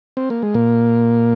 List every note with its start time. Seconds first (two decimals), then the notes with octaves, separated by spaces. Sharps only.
0.17 C4
0.30 A#3
0.42 G#3
0.54 A#2 A#3